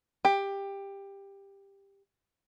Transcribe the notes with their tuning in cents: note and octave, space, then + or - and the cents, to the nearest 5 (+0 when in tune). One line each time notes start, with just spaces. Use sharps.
G4 +15